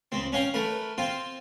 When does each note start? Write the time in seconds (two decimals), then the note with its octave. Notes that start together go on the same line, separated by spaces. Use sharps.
0.12 C#2 C4
0.32 C#4 C#5 F5 G5 A#5
0.54 A3 A#4 B4
0.98 C4 F4 G5